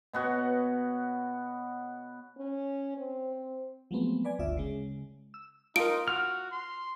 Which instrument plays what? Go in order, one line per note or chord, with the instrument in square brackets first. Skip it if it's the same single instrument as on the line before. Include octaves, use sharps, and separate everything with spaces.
[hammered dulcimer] B2 B3 F#4 C#5
[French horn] C#4
C4
[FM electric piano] F3 F#3 G#3 A3 B3 C4
B4 D5 G#5
G1 D2 F4 D5 E5
C#3 G#3
E6
[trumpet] D#4 [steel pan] F4 A#4 [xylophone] D7
[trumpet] F#4 [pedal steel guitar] F6
[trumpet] C6